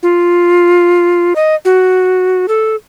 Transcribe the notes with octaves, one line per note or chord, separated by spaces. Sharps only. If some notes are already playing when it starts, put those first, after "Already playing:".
F4
D#5
F#4
A4